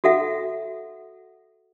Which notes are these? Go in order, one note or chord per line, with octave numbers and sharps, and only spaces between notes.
F#4 A4 E5 F#5